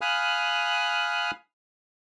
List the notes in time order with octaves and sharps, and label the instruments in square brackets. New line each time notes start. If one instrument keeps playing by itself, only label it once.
[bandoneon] F5 G#5 B5 D#6 F6 F#6